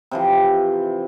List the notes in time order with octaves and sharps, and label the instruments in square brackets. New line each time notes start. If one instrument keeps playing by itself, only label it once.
[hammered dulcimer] C3 E3 F3